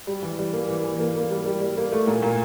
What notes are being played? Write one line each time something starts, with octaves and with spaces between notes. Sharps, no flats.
G3
E3
G3
A#3
E3
E3
A#3
A#3
G3
G3
G3
A#3
A3
A#2
A#2